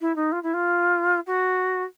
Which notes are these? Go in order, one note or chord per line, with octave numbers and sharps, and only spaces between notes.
E4
D#4
F4
E4
F4
F#4